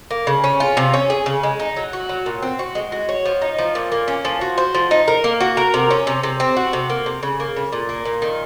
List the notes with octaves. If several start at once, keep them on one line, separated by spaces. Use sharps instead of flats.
A#3
C#3
C#4
F4
C3
C#4
G#4
C#3
G#3
D#4
F#3
F#4
F#3
A#2
C4
F#4
G#3
F#4
C#5
F3
D#4
F3
A#2
A#3
C#4
F3
F#4
C5
F3
D#4
A#4
A#3
F#4
A#4
C3
C#4
C3
C3
C4
F#4
C3
A#3
C3
C#3
A#3
C#3
A#2
A#3
A#2
D#3